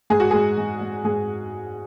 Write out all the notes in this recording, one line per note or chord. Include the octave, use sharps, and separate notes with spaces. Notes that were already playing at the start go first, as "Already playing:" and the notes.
G#2 G#4
F#4
G#3 G#4
G#3
G#3
G#2 G#4